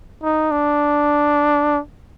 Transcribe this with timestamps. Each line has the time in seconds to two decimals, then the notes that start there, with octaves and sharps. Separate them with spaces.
0.23 D#4
0.51 D4